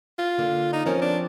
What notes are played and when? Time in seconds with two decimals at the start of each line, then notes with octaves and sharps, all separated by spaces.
0.18 F4
0.38 D3 A#3
0.73 D#4
0.86 F3 C4 C#4 A#4
1.02 D4